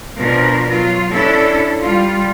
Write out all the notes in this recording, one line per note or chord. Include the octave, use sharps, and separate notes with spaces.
B2 F3 D4 A#4
F#3 F4
C#4 D4 E4 A4
G3 F4